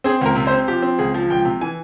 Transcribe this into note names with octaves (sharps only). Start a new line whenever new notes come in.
C4 G#4
C#2 A#4
C3
C5
C4
F3 G4
C4
C#2 G#4
F3
C#2 G5
C3
E3 G#5